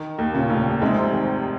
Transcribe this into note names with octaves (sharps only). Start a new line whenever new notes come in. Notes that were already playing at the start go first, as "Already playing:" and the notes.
Already playing: D#3
D#2
A#2 C#3
F1
G#2 C3 G#3
D#3